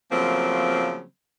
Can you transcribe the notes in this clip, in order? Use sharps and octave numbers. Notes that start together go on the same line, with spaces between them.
C#3 F3 F#3 A3 A#3 C4